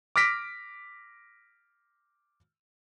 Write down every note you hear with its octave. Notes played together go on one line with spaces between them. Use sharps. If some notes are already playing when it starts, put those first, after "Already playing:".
D6 F6 A#6 B6 D7